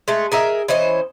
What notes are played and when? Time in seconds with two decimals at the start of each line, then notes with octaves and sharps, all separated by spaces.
0.08 G#3 A3
0.32 G#4 A#4 D#5 E5
0.68 E3 C#4 C5 D#5